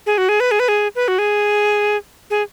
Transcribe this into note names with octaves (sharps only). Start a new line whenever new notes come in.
G#4
F#4
G#4
B4
G#4
B4
G#4
B4
F#4
G#4
G#4